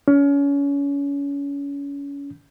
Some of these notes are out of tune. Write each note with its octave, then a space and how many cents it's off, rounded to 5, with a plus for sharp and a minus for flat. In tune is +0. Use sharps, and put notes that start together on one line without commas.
C#4 +30